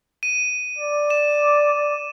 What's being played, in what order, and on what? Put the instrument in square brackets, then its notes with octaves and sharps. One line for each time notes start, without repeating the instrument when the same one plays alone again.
[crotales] D#7
[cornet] D5
[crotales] E7